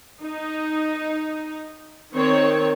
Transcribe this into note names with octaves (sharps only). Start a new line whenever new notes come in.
D#4
D#3 C4 C#5